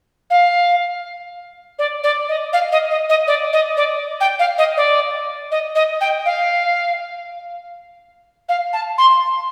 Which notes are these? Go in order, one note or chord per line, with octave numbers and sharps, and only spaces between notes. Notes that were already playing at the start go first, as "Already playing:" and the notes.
F5
D5
D5
D#5
F5
D#5
D#5
D#5
D5
D#5
D5
G5
F5
D#5
D5
D#5
D#5
G5
F5
F5
A5
C6